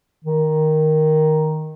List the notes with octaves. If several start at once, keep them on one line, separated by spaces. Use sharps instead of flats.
D#3